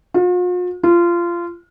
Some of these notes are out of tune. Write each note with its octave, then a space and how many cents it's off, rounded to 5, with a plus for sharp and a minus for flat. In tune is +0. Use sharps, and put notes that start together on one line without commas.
F4 +45
F4 -20